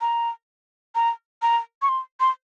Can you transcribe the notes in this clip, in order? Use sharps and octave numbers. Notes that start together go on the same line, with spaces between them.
A#5
A#5
A#5
C#6
C6
C6